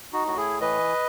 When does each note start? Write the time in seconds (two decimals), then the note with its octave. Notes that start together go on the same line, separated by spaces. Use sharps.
0.13 D#4 F#4
0.25 A2 F#4
0.37 E4 G#4
0.61 E3 B4 D#5